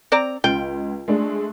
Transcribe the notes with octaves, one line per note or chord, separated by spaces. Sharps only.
C4 D5 A#5
C#2 F4 G5
G#3 A3 D4